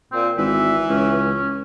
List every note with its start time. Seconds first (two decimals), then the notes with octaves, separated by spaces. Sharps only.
0.12 A#2 C4
0.38 G#1 E3 E5
0.89 C#2 C#4